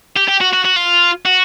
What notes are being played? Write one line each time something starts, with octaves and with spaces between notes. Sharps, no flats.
G4
G4
F#4
F#4
F#4
F4
F#4